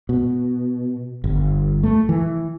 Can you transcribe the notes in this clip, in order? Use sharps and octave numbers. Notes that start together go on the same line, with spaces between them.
B2
G1
A3
E3